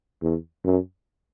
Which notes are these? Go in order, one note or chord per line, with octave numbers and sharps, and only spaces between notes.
E2
F#2